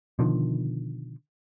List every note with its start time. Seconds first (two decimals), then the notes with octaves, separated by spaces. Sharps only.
0.19 B2 D3 D#3 F3